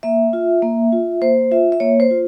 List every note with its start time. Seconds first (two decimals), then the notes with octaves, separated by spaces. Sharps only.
0.03 A#3 E5
0.33 F4
0.62 A#3
0.92 F4
1.22 A#3 C5
1.51 F4 E5
1.72 E5
1.80 A#3 C#5
2.00 C5
2.11 F4